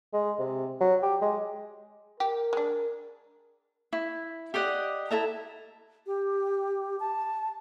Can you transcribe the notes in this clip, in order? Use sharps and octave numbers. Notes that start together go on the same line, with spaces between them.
G#3
C3
F#3
G4
G#3
G4 A#4
G#3 D4
E4
G4 D5 D#5 F#5
E4 A4 E5 A#5
G4
A5